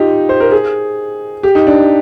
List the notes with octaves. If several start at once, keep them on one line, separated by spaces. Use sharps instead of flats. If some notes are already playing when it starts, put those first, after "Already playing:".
Already playing: D#4 F4 G4
C5
A#4
G#4
G4
D#4
D4